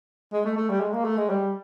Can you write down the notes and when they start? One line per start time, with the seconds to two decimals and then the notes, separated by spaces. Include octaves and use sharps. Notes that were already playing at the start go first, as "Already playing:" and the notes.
0.33 G#3
0.45 A3
0.57 A3
0.69 G3
0.80 G#3
0.93 A#3
1.05 A3
1.17 G#3
1.29 G3